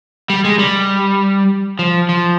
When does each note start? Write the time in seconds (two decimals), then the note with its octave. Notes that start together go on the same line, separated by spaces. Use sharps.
0.30 G3
0.44 G#3
0.59 G3
1.79 F3
2.09 F3